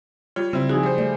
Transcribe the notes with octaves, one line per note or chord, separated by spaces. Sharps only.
G3 F4 C#5
C#3 G3 C4 E4
F3 D#4 F#4 G#4
G3 C5
A3 D5